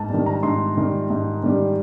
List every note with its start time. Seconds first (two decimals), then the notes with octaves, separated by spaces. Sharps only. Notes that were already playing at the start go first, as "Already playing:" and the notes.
Already playing: G#2 A5
0.10 D#3 G3
0.26 A#5
0.43 G#2 C6
0.77 D#3 G3
1.10 G#2
1.43 D#3 G3